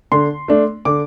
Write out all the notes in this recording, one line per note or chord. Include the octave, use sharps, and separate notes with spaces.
D3 C6
A3 D4
D3 D6